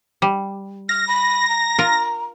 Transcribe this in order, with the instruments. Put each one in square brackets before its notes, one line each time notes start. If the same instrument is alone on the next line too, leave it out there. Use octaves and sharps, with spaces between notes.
[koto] G3
[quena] F6 [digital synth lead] A#6
[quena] B5
A#5
[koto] F4 A#4